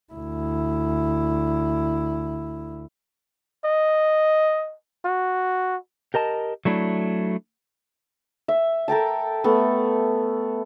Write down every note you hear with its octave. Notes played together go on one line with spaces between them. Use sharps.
D2 E4
D#5
F#4
G4 A#4 D#5 A5
F#3 A3 D4 E4
E5
A4 A#4 G5 A5
A3 B3 A4